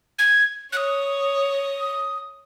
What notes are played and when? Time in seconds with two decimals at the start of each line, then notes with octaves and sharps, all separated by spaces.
0.19 G#6
0.73 C#5 D#6 F#6